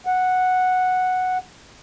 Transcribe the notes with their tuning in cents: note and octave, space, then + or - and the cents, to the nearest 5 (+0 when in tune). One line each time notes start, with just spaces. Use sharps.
F#5 -5